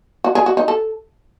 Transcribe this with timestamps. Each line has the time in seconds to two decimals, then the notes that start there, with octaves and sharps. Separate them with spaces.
0.24 F#4
0.35 G#4
0.46 F#4
0.57 D#4
0.68 A4